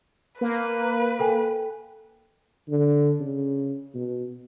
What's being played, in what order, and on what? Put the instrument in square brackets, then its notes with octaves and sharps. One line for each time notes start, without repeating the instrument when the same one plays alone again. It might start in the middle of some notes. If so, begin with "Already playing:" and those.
[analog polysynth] A#3 [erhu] B4
[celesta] A4 G5 G#5
[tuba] D3
C#3
B2